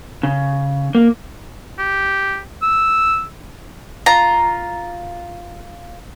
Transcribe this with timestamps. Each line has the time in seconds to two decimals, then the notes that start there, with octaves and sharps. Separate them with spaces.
0.23 C#3
0.95 A#3
1.79 G4
2.63 E6
4.06 F4 A#5